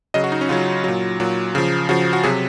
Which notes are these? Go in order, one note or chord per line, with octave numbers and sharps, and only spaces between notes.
C#3 F#3 D#5
F#4
D#4
C#4
C#3 F#3 F4
A#2 F#3
A#2 F#3
C#3 F3
C#3 F3 F#4
F#4
C3 F#3 G#4